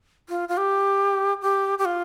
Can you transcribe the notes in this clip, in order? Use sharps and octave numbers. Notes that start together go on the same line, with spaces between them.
F4
F4
G4
G4
G4
F4